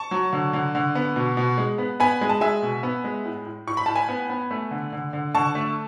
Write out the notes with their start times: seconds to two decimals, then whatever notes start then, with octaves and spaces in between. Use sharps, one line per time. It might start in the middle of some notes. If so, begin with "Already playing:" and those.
Already playing: A5 C#6
0.11 F#3
0.33 D3
0.53 D3
0.75 D3
0.95 B3
1.16 B2
1.37 B2
1.58 G#3
1.78 B3
2.00 B3 G#5 B5
2.21 G#3
2.29 A5
2.41 G#3 E5 G#5
2.62 B2
2.83 B3
3.04 G#3
3.25 A2
3.46 A2
3.67 A2 C#6
3.77 B5
3.86 A2 A5
3.95 G#5 B5
4.09 B3
4.30 B3
4.51 A3
4.71 D3
4.93 D3
5.13 D3
5.35 D3 A5 C#6
5.55 A3